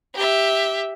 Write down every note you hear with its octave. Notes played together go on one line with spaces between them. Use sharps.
G4 E5